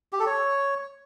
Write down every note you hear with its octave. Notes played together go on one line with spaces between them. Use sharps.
G4
A4
C#5